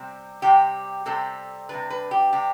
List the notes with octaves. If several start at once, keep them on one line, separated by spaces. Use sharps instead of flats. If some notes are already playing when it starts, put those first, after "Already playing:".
Already playing: C3 G3 C4
C3 G3 C4 G4
C3 G3 C4 A4
C3 G3 D4 B4
B4
G4
C3 G3 D4 G4